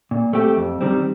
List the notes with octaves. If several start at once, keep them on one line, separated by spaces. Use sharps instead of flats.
A#2
A3 C4 G4
F2
D#3 G3 C4